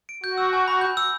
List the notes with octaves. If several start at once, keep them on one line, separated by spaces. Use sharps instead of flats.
D7
F#4 G6
E6
G#5
B5
G6
E6